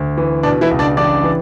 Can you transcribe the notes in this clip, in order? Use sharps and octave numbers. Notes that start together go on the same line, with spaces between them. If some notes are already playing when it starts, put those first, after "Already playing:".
Already playing: D2
E3
B2 D4
E3 E4
C#2
D4 D5
A1 D4 D5
E3